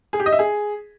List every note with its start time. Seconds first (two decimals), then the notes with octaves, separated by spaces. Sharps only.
0.13 G#4
0.20 G4
0.26 D#5
0.32 E5
0.39 G#4